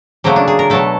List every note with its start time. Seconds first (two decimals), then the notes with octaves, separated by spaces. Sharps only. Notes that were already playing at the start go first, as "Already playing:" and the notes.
0.24 C#3 F#3 A3 A#3
0.36 D4
0.48 G#4
0.59 A#4
0.70 B2 F#3 A3 A4